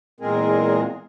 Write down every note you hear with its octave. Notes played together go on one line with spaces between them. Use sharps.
E2 A#2 G#3 C4 G#4 A#4